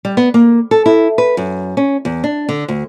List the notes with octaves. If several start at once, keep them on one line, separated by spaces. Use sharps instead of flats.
G3
B3
A#3
A4
E4
B4
F#2
C#4
E2
D4
D3
D2